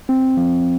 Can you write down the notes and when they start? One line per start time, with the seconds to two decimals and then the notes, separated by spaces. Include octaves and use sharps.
0.09 C4
0.37 F3